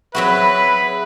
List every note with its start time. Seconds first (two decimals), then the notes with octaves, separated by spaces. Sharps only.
0.15 F#3 C4 F#4 G#4 B4 E5 B5